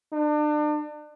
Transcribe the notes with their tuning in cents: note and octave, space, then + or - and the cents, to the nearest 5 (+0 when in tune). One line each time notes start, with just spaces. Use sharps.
D4 +35